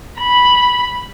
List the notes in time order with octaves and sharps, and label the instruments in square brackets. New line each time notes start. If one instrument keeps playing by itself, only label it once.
[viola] B5